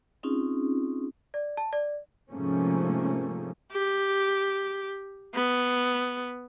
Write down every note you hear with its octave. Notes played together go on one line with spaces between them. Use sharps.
C4 C#4 D#4 F4 G#4
D5
A5
D5
G#2 C3 F3 A3 A#3 C#4
G4
B3